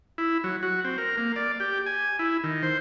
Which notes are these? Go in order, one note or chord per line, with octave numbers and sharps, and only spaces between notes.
E4
F#3
F#4
C4
A#4
A#3
D5
G4
G#5
E4
D#3
C5